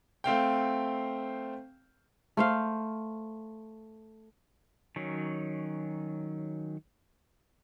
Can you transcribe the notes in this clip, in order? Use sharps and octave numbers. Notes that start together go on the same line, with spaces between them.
A3 C4 F5 G5
A3 C5 F5
D#3 F#3 C#4